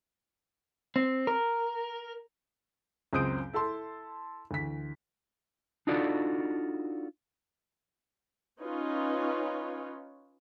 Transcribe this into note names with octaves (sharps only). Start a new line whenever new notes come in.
C4
A#4
C#2 F#2 C4 D#6 G6 D7
E4 A4 A5 C6
D2 E3 B6
D4 D#4 F4 F#4 A4 D5
C#4 D#4 F4 B4 C#5